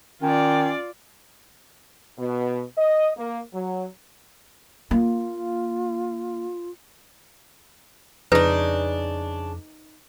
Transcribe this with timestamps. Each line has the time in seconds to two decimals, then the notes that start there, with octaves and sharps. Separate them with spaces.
0.22 D#3 C#4 F4 D5
2.18 B2
2.77 D#5
3.18 A#3
3.53 F#3
4.91 A#3 F4
8.32 F2 C#3 D4 D#4 B4